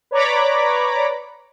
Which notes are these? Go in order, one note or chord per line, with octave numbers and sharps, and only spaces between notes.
B4 C#5 D5 A#5 B5 D6